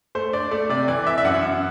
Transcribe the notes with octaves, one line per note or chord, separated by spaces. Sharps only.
A3 C5
D4 D5
A3 D5
C3 D5
E3 D5
E3 E5
E5
F#2 F#5
F#2